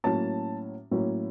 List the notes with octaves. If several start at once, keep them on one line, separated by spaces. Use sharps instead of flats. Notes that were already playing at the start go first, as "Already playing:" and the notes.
A2 F#3 A#3 C#4 A5
A2 F#3 A#3 C#4